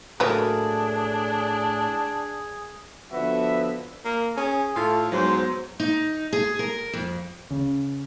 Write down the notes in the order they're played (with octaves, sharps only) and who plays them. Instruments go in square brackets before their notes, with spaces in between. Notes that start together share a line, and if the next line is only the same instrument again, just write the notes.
[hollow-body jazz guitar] A2 A#4 [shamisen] F#3 A#3 B4 [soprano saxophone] D4 [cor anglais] G#4
[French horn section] D3 F3 B3 [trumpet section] F#4 B4 E5
[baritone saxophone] A#3
[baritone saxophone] C#4 [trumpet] G#4
[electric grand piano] A2 [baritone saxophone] F4 [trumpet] A4
[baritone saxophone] G#2 [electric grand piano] F#3 B3 [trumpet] C5
[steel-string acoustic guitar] D#4
G#4
A#4
F2
[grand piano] C#3